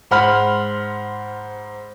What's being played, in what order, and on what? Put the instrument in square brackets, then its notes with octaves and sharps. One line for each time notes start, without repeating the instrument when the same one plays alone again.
[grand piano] G#2 C5 F#5 B5 F6